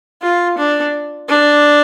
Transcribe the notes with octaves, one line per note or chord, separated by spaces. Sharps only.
F4
D4
D4